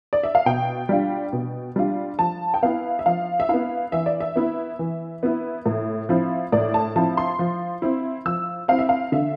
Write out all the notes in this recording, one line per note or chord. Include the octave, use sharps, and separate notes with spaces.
D5
E5
F5
B2 G5
G3 D4 F4
B2
G3 D4 F4
F3 A5
G5
B3 E4 F5
E5
F3 F5
E5
B3 E4 F5
E3 E5
D5
E5
B3 E4
E3
B3 E4
A2
F3 C4 E4
A2 D5
A5
F3 C4 E4 A5
C6
F3
C4 E4
F3 E6
C4 E4 F5
E5
F5
D3 E5